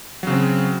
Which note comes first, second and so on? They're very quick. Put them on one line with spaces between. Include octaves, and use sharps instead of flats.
F#3 C#3 C4